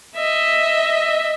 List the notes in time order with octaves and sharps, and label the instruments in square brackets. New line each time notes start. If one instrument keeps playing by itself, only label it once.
[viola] D#5 E5